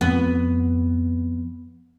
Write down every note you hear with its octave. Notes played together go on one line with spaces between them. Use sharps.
F2 B3